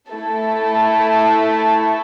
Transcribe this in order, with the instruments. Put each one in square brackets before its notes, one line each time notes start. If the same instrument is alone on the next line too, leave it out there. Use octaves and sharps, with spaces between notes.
[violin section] A3 E4 A4